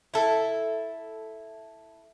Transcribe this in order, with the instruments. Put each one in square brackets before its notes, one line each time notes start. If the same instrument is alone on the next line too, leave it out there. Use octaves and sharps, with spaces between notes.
[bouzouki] E4 A4